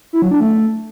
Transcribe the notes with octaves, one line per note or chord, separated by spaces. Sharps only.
E4
F#3
D4
A3